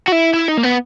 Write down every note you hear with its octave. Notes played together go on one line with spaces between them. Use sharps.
F#4
E4
E4
D#4
A#3
B3